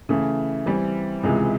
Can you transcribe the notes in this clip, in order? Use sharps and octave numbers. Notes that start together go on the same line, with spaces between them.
C#3 E3 A3
E3 G3 C4
C#2 C3 E3 G#3